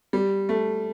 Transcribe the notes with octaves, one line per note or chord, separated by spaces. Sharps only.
G3
A3